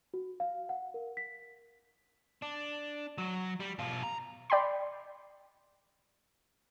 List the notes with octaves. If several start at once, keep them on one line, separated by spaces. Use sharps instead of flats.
F#4
F5
F#5
A#4
B6
D4
F#3
G3
B2 F4
A#5
D5 G5 B5 C6